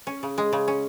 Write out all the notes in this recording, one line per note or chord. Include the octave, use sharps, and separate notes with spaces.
C#4
C#3
G#3
C#3
C#4